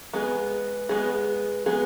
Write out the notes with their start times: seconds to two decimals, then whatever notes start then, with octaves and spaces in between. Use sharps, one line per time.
0.13 G#3 B3 G#4
0.89 G#3 B3 G#4
1.66 G#3 B3 G#4